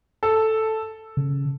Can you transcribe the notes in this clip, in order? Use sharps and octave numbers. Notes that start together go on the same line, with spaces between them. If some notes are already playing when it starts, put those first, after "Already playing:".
A4
C#3